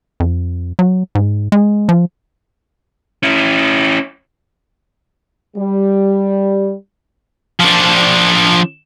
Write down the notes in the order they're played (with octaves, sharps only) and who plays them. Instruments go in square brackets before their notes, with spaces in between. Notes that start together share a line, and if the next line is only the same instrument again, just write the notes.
[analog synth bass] F2
F#3
G#2
G#3
F3
[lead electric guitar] C#4 E4
[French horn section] G3
[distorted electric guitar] F3 D4